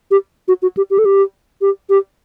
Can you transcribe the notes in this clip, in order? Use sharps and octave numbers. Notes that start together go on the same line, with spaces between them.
G4
F#4
F#4
G4
G4
A4
G4
G4
G4